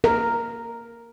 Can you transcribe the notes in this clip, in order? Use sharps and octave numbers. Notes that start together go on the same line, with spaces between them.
A#4